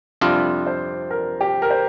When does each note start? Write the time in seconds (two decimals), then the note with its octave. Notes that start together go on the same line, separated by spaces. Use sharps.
0.21 F2 C3 G3 D4 F4 D5
0.67 C5
1.10 A#4
1.40 G4
1.62 A#4
1.70 C5